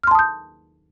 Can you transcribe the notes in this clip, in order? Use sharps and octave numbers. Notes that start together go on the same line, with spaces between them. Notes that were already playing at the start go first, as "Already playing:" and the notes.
A5 C6 D#6 F6 G6